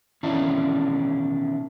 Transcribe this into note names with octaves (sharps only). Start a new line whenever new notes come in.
B2 D#3 E3 C#4 D4 E4